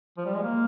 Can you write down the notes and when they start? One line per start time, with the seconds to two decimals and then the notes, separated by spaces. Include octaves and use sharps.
0.18 F3
0.26 G3
0.34 G#3
0.43 A#3